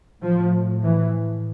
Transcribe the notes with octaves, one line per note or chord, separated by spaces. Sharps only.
A2 F3
E3